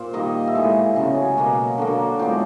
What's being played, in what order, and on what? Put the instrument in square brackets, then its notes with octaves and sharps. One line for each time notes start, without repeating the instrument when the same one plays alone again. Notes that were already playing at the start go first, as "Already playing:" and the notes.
Already playing: [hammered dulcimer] A#2 C5
D#3 G3 A#3 D#5
E5
A2 E3 G#3 D#5
C#3 F#3 B3
G#5
B2 F#3 A#3
D3 F#3 A#3
A2 F3 G#3 B3 G5